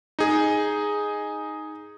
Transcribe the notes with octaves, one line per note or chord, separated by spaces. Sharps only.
D#4 G#4